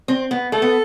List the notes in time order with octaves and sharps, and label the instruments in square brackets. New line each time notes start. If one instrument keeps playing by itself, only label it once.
[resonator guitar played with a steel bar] C4
B3
[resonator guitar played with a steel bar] A3 [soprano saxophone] A4
[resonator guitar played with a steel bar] B3